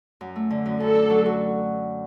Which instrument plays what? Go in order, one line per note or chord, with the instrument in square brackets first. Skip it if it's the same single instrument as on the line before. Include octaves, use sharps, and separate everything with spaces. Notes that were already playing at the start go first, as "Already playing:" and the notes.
[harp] F#2
A3
D3
F#2
[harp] F#2 [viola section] A4
[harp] D4
F#3
F#4